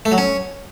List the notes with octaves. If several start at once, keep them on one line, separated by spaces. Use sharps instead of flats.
A3
F#3
C#4